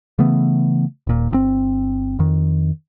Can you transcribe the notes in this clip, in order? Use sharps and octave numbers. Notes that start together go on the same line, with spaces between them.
C#3 E3 A3 B3
D#1 A#2
G1 C3 C4
F2 D#3